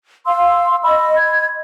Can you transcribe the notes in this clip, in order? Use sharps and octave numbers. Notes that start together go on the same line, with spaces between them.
F5 C6 E6
D#5 B5 E6
G#6